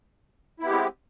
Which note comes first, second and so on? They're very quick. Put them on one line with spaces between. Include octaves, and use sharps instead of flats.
E4 B3 G4 G#3 C4